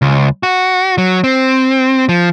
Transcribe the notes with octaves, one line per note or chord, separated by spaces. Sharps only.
C#2
F#4
F#3
C4
F3